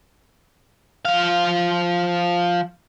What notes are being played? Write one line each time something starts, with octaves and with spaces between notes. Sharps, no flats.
F3 F5